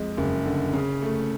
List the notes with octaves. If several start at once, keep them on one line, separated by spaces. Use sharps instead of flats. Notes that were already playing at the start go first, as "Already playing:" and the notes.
Already playing: F2 G#3
F#1
D3
C#3
A3